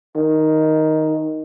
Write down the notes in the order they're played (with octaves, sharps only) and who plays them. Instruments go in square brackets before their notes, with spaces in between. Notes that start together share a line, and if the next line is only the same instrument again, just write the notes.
[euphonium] D#3